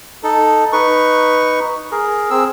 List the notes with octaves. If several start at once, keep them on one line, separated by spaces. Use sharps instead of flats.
D#4 A4
D#4 B4 C#6
G#4 A#4
C4 G#4 E6